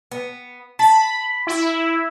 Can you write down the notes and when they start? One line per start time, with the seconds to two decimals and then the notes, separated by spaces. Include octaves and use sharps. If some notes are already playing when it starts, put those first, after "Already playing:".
0.11 B3
0.79 A5 B5
1.47 E4